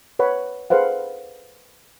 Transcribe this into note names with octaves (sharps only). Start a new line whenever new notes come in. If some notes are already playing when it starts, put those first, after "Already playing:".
B4 C#5 F#5 B5
G#4 A4 B4 C5 F5 F#5